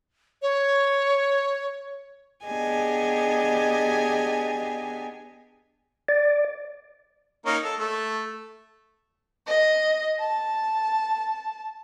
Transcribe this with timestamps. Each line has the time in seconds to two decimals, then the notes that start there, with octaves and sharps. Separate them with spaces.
0.42 C#5
2.45 B3 D4 G4 G#4 D#5 G#5
6.08 D5
7.46 A#3 C#4 D#4
7.64 A4
7.79 A3
9.46 D#5
10.19 A5